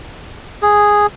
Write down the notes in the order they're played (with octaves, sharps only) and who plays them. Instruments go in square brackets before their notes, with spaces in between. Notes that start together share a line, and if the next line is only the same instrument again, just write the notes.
[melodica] G#4